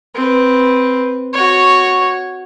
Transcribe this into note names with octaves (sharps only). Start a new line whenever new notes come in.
C4 B4
F#4 C#5